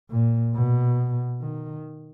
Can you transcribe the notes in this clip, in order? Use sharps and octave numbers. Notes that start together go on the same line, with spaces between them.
A#2
B2
D#3